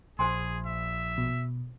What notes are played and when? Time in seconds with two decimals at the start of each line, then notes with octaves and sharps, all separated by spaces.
0.19 A#1 G#4 C5 G#5 C6
0.66 E5
1.18 B2